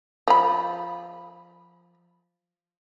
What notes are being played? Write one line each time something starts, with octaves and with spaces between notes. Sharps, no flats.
F3 B5